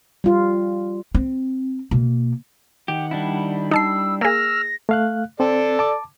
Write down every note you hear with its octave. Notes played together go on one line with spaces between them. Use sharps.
G3 F4
C4
B2 A#3
D#3 G4 F#5
G3 D4 E4
D#4 A5 E6 C7
A#3 G#4 E6 F6 A#6
A3 F5 F#6
C4 A4 D5
A5 D6